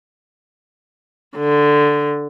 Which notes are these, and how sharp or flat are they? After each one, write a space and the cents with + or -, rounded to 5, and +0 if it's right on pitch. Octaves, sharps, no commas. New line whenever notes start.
D3 +0